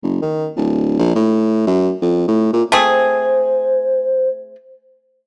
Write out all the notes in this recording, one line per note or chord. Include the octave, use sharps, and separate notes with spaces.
F#1
D#3
D1
A#1
A2
F#2
F2
A2
A#2
A3 C4 G#4 C5